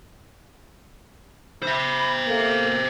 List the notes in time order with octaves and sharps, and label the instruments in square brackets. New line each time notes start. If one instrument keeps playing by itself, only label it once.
[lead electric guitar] C5 E5 [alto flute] B5
[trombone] A#3 [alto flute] A4